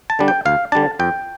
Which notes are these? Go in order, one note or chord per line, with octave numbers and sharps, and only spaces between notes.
A5
D3 G3 D4
G5
D2 F5
D3 G3 D4 A5
F2 G5